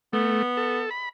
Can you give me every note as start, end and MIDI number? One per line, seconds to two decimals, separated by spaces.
0.13 0.42 57
0.13 0.83 59
0.57 0.90 69
0.90 1.09 83